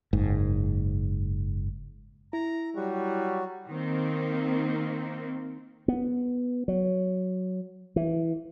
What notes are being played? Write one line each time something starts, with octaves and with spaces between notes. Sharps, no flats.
F#1 G#2
E4 A#5
F#3 G3 F#4
D#3 A#3 C4
B3
F#3
E3